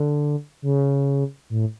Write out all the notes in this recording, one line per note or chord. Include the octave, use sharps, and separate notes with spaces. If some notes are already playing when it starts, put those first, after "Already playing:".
Already playing: D3
C#3
A2